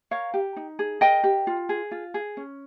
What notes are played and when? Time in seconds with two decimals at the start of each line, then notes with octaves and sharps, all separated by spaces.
0.11 A#4 C#5 F5
0.34 G4
0.56 D#4
0.79 G#4
1.01 A#4 D#5 G5
1.24 G4
1.47 F4
1.69 G#4
1.91 F4
2.14 G#4
2.37 C#4